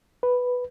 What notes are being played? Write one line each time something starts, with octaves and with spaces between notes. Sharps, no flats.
B4